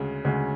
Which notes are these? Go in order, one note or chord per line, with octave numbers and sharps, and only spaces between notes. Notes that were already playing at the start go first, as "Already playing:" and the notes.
Already playing: D2 C#3 G#3
D2 C#3 G#3